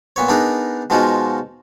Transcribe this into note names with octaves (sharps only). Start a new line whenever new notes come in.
A#2 B3 C#5
B3 D4 D#4 G#4 A#4
B2 F3 G#3 D#4 F4 F#4